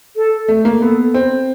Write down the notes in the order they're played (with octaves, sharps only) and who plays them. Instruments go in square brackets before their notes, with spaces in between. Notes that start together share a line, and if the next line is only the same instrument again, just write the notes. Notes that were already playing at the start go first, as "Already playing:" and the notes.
[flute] A4
[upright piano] A3
A#3
[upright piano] B3 [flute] A4
[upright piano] C4